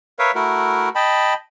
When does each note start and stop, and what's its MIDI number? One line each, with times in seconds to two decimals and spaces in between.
0.19 0.31 70
0.19 0.31 71
0.19 0.31 73
0.19 0.31 76
0.19 0.31 77
0.35 0.89 57
0.35 0.89 64
0.35 0.89 66
0.35 0.89 70
0.95 1.34 75
0.95 1.34 79
0.95 1.34 81
0.95 1.34 83